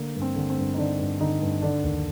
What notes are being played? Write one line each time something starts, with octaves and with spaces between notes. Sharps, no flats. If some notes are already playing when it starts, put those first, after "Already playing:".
Already playing: D3 A#3
G2
C4
D3
C4
G2
D#4
D3 D4
G2
D3 D#4
G2
D3 D4
D#2